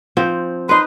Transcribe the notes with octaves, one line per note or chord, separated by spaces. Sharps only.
F3 C4
D#4 B4 C6